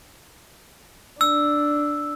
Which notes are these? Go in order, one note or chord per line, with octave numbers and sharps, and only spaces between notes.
D4 E6